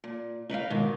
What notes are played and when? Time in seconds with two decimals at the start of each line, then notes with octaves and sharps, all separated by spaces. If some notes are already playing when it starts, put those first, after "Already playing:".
0.04 A#2
0.50 D#4 B4 D5 F5
0.70 G#2 B2 D#3